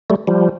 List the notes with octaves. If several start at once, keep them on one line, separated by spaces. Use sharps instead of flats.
G3 A3
F3 G3